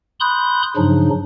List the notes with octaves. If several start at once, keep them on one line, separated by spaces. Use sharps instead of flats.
B5 C6 D#6 F#6 G6
G2 C#3 F3 F#3 D4 D#4